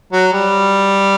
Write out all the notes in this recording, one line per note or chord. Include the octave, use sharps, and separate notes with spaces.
F#3
G3